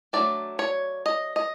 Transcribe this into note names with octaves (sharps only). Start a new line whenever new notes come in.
F#3 A3 D4 D5
C#5
D#5
D#5